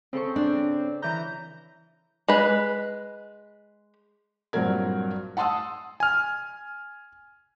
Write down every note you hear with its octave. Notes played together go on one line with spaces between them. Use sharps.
C#3 C4 A4 C#6
D4
E3 A#5 G6
G#3 B4
G2 A#2 F#3 C4 A#4 G#6
F#5 A5 C6 D#6 E6
G#5 F6